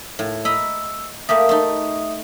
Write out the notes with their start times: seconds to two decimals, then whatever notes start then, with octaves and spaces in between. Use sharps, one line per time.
0.19 A2
0.45 D#5 A#5 B5 E6
1.29 A3 A#3 G4 E5 D#6
1.49 A3 D#4